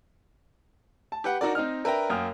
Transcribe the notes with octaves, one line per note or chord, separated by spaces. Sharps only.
A5
G4 B4 F#5
D4 D#4 F#4 A#4 D5
C4 D#4 D#5 F6
D4 A#4 B4 E5 G5 A#5
F#2 A#3 G5 D#6 F6